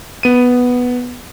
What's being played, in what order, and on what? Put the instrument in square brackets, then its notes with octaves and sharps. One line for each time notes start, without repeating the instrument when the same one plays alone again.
[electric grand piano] B3 D#7